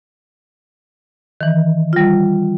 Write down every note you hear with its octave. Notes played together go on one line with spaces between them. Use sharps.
D#3 E3
G3 F4